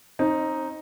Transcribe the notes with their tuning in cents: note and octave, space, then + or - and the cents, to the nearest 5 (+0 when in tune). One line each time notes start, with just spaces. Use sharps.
C4 +35 D#4 +0